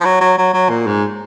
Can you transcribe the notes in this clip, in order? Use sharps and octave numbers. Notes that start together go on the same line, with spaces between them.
F3
F#3
F#3
F#3
F#3
A#2
G#2